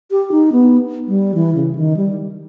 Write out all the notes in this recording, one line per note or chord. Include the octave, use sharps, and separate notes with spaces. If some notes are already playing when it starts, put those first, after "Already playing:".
G4
D#4
B3
G3
E3
C#3
D#3
G3